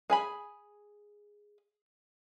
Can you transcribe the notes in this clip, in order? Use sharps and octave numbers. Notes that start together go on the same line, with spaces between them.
G#4 G#5 B5